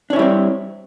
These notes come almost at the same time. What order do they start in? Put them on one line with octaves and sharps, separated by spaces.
D4 C#5 E4 G3 C4